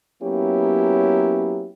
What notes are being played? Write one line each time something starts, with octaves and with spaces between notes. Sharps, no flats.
F#3 A#3 B3 C#4 E4 G4